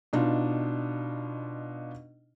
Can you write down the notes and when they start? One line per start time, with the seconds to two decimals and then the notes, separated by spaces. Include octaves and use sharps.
0.13 B2 D4 D#4 F4